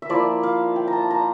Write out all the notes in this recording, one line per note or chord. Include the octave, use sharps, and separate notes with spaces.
E5
F3 A#3 E4 D5
F5
G5
A#5
A5
A#5